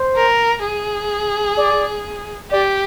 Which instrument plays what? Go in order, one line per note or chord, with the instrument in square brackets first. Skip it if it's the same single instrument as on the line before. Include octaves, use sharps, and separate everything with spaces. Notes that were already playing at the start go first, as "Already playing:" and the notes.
Already playing: [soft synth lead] C5
[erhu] A#4
G#4
[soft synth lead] D5
[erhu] G4 [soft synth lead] D5